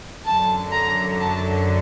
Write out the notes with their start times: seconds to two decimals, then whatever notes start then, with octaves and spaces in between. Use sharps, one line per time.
0.25 F#2 D3 F#3 A5
0.73 A#5
1.20 A5